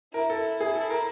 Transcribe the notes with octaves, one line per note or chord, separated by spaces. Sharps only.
E4 A#4
A4
G#4
A4
A#4